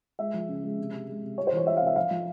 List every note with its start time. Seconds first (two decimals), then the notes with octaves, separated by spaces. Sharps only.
0.19 G#3 E5
0.34 F3
0.49 C#3
0.64 G#3
0.79 C3
0.93 C3
1.08 G#3
1.23 C3
1.38 G3 C#5
1.47 C5
1.52 E3 C#5
1.67 G3 E5
1.77 F5
1.82 C3 E5
1.96 F3 F5
2.11 F3